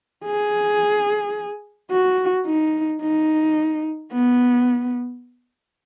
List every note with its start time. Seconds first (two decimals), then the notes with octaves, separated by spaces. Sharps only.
0.25 G#4
1.91 F#4
2.46 D#4
3.02 D#4
4.12 B3